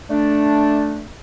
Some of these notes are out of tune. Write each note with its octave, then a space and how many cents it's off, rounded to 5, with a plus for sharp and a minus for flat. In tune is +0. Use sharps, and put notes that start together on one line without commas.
A3 -5 D4 +0